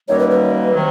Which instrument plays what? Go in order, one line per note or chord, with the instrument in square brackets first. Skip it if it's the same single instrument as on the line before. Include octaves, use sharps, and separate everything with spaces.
[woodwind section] F#2 D#3 G3 A#3 [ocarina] C#5
[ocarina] B4
B4
[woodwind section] C3 D#3 F#3